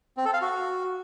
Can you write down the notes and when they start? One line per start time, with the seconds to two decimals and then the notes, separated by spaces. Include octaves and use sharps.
0.17 C4
0.25 A4
0.33 F5
0.42 F#4